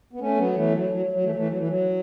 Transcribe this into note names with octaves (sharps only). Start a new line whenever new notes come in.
B3
A3 C#4
F#3 B3
E3 A3
F#3
F#3
F#3
E3 A3
E3 A3
F#3
E3
F#3